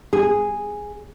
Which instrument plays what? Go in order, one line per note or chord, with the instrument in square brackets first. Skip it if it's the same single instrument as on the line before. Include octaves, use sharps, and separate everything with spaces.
[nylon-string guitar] G#4